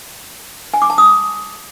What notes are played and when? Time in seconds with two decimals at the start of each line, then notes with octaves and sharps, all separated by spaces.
0.74 G#5
0.82 D6
0.90 A5
0.98 D#6